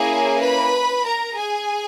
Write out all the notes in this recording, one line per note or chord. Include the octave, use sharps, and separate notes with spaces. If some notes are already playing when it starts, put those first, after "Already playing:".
Already playing: A#3 C#4 E4 G#4 G#5
B4 B5
A#4 A#5
G#4 G#5